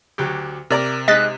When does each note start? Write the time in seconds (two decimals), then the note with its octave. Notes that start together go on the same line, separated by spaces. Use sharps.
0.18 D2 F#3 G4
0.70 C3 A#4 D5 A#5
1.08 G#3 D#4 D#5 F#6 A6 B6